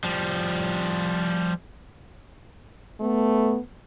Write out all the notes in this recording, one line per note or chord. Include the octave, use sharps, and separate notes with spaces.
F3 G3
A3 B3